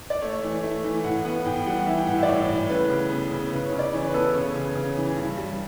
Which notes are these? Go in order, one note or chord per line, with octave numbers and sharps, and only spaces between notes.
D5
A3 C#5
E3
A3
E3
A2 F#5
B3 F#5
A2 G5
G5
G3 F#5
F#5
E3 E5
G5
A2 F#5
E5
D5
A2 C#5
A2
C#3 B4
C#3
B3
C#3
C#3 B4
C#5
C#3
D5
E3 C#5
B4
B3 A4
C#3 C#5
C#3
C#3
E3
G2
G3